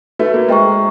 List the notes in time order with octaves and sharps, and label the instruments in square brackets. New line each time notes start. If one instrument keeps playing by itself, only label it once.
[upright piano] A3 [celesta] D#4 F#4 B4 E5
[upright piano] A#3
[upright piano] G#3 [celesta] C5 E5 G5 A#5 C#6